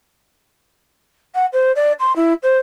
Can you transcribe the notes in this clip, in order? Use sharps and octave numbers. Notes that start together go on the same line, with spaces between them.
F#5
C5
D5
C6
E4
C5